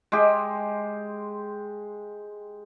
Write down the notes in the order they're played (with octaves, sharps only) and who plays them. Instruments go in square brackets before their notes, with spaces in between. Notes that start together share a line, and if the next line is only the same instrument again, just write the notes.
[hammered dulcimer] G#3 G4